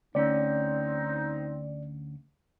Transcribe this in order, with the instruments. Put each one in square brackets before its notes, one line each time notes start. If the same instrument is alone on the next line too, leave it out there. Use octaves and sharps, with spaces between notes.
[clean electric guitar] D2 C#4 [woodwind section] C4 D#4 [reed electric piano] D5